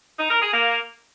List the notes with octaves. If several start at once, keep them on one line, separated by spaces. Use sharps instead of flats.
D#4
A#4
G#4
A#3